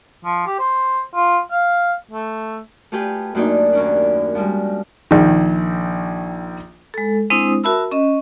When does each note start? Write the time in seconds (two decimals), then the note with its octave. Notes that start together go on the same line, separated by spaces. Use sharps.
0.25 F3
0.47 G4
0.59 C5
1.15 F4
1.51 F5
2.11 A3
2.92 A3 F4 G4 G#4 B4 G5
3.35 F#2 A3 A#3 D4 D#4
3.73 D#2 C#4 D4
4.35 F3 G3 G#3
5.11 A#1 D#3
6.94 G#3 A4
7.30 G#3 C4 D4 E4 C5 D#6
7.64 F#4 A#4 E5 A5 B5 E6
7.92 C#4 D#5